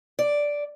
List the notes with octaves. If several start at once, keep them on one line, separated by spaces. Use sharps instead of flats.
D5